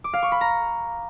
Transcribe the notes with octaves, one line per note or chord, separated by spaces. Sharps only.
D6
F5
C#6
B5
A#5